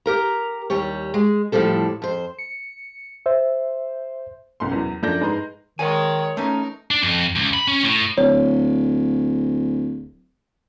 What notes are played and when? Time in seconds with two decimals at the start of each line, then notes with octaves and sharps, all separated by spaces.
0.06 G4 A#4 A#5
0.70 D#2 G3 G4 C#5
1.14 G#3
1.52 F2 A2 E3 F3 G3 A4
2.02 F2 C5
2.38 C#7
3.26 C5 E5
4.60 F#1 B1 C#4 C6
4.72 E2 F#3
5.02 F#2 F3 D4 A4 G6 A#6
5.20 G#2 G#3 B4 A#5 C6
5.79 D#3 G#3 C#5 G#5
6.37 A3 C#4 D#4 A#4
6.91 D4
7.03 F2
7.36 C#2
7.54 B5
7.68 C#4
7.84 A2
8.18 D1 C#5